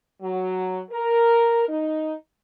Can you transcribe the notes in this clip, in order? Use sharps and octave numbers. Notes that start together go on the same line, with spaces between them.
F#3
A#4
D#4